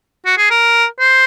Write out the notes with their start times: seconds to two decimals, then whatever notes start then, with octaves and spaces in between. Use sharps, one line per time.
0.26 F#4
0.38 G#4
0.50 A#4
1.00 C5